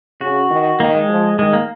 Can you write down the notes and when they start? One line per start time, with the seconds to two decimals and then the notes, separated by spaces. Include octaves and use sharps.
0.21 C#3 F#4
0.50 D#3
0.79 D#3 A#3
0.95 G#3
1.09 F3
1.39 D#3 G#3
1.53 A#3